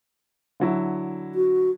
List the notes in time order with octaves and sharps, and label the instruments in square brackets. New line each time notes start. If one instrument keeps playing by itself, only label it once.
[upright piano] D3 F#3 E4
[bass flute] F#4